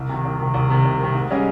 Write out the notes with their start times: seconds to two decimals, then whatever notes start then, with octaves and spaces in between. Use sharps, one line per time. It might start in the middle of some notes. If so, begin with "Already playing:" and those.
Already playing: C2
0.09 C3 D#3
0.24 C2
0.39 C3 D#3
0.54 C2
0.70 C3 D#3
0.84 C2
1.00 C3 D#3
1.15 G#2
1.30 G3 C#4 G#4 D#5